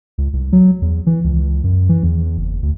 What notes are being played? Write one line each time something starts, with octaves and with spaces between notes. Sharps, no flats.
C#2
C2
F#3
E2
E3
C#2
F#2
E3
E2
F#1
D2